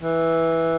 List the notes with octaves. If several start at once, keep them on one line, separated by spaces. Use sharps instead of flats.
E3